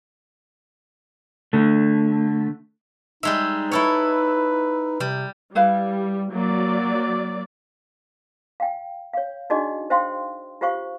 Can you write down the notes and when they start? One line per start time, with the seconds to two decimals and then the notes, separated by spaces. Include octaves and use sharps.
1.53 D3 A3
3.23 G3 G#3 D#4 E5
3.72 E4 A4 B4 C#5
5.00 C3 G3
5.55 G3 E4 B4 F5
6.33 F#3 A#3 D5
8.60 F5 G5
9.14 C#5 F5
9.50 D4 D#4 F#4 G#4 D5 D#5
9.90 C5 E5 F5 G5 C6
10.61 F4 G4 C5 F5 C#6